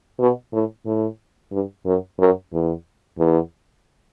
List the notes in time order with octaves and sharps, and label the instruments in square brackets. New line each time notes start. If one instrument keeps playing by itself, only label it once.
[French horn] B2
A2
A2
G2
F#2
F#2
E2
E2